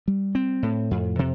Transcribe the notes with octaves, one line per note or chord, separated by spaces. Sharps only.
G3
C4
A2
F2
C3